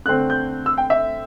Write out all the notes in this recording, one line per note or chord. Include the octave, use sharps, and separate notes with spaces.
D3 A3 C4 F#6
G6
E6
G5
E5